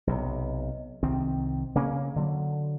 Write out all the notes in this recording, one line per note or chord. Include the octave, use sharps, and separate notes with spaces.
B1 C3
C2 D#3 C4
C#3 A#3 C#4
D3 F#3